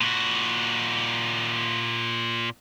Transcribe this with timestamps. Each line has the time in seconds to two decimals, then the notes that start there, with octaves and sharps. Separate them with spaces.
0.01 A#2 F#4